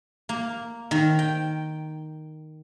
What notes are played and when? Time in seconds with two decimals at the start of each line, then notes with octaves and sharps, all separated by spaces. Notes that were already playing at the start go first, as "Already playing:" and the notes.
0.29 A#3
0.91 D#3
1.19 G5